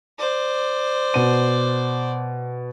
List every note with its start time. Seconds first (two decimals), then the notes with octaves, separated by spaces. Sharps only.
0.19 C5 D5
1.14 B2 D#7